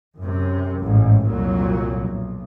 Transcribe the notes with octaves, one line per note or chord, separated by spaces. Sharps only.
F#2 C3
A1 G#2
C2 F2 A#2 F#3
B1